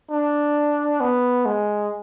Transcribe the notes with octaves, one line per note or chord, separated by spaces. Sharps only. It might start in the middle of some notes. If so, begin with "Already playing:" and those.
D4
B3
G#3